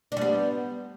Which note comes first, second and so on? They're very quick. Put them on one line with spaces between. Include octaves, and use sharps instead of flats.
D4 G3 B3